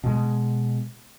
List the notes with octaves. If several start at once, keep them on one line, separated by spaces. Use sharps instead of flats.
B2 G#3